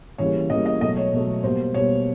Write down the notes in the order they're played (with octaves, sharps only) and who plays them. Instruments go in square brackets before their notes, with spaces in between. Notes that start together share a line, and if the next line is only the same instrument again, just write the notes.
[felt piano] C#3 E3 G3 A#3 C#5
C#3 E3 G3 A#3 D#5
D#5
B2 F#3 A3 D#5
C#5
B2 F#3 A3
B2 G3 A#3 C5
B2 G3 A#3 C#5